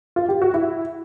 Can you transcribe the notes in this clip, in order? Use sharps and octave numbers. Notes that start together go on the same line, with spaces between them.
F4
G4
F#4
E4